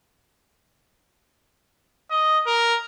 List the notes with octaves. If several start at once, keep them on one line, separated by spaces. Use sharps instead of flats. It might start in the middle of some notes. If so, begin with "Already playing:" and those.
D#5
A#4